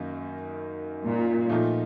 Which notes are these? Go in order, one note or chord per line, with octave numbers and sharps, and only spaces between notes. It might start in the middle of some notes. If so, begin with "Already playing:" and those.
Already playing: F#2 D#3 A#3 D#4
A#2
A#2 F3 A3 D#4